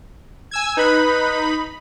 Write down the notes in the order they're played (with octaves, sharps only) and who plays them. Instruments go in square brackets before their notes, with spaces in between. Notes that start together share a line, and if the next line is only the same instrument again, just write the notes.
[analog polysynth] G#5 E6 G#6
[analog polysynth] D#4 B5 [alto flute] B4